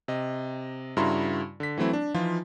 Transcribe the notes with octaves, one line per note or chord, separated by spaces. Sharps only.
C3 D#5
G2 C#3 E4 F#4 A#5 C6
D3 B6
E3 F#3 A3 C4 E4
D4
E3 F3 D#4 F4